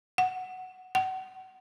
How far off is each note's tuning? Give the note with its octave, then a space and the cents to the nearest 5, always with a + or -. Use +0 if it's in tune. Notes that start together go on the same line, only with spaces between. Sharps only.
F#5 +0
F#5 +30